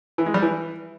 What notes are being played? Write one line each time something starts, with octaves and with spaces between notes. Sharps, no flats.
E3
G#3
G3
E3